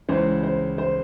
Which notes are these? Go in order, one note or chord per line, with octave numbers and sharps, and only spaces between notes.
C#2 C#3 E3 C5
C5
C5